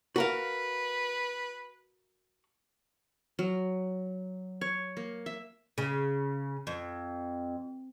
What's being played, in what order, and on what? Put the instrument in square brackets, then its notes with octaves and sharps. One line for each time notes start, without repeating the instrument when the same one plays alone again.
[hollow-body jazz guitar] F#4 A#4 F5 [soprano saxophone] B4
[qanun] F#3
C#5
A#3
E5
[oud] C#3
F2